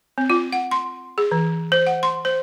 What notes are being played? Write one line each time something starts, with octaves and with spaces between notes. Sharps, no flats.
C4
F4
F#5
C6
G#4
E3
C5
F#5
C6
C5